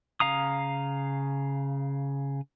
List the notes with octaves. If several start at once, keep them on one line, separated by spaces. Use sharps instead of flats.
C#3 F5 A#5 D#6